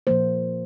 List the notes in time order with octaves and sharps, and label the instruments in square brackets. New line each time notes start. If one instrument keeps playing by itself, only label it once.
[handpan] A#2 F3 A#3 C5